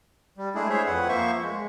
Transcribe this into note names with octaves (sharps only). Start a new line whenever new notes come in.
G3
G#3 A3 D4 E4 G#4
G#4 C5 C#5 E5
F2 B4 F#5
F3 A#3 C5 E5 C#6
G#3